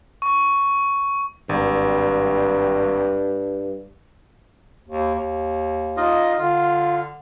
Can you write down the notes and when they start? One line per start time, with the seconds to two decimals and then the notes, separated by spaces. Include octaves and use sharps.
0.22 C#6
1.49 G#1 G2
4.88 D#2
5.15 D#2
5.97 D#4 F4 D#5
6.38 D3 F4